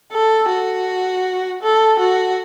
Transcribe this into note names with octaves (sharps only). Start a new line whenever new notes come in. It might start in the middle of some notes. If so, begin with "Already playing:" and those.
A4
F#4
A4
F#4